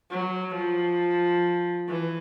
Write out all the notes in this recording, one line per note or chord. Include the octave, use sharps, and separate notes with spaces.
F#3
F3
E3